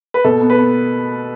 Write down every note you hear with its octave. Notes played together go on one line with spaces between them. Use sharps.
B4
B2 A4
B3
B4
B3